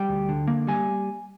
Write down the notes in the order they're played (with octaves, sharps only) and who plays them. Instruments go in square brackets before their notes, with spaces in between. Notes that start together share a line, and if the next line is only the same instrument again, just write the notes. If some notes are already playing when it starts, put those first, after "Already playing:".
Already playing: [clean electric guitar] G3 G5
D2
D3
A#3
G3 G#5